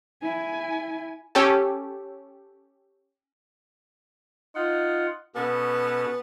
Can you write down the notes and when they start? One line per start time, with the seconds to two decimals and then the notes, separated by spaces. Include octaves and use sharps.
0.22 E4 G#5
1.35 C#4 G4 A4
4.55 D#4 F4 F#5
5.35 B2 B3 C#4 A4